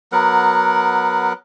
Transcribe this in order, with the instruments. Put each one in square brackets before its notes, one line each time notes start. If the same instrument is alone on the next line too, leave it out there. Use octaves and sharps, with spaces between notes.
[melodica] F#3 B3 A#4 F#5